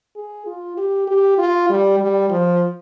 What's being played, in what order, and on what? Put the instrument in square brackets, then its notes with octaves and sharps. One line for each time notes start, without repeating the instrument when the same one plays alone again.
[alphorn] G#4
F4
G4
G4
F4
G3
G3
F3